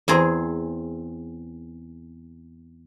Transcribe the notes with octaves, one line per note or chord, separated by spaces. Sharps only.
E2 C4 G#4 A#5